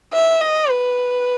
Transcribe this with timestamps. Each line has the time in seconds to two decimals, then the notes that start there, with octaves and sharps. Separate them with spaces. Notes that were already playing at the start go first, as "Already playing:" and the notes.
0.13 E5
0.41 D#5
0.70 B4